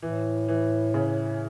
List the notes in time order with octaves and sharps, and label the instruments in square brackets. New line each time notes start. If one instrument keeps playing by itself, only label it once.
[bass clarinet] A2 [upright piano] E3
[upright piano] E3
C#3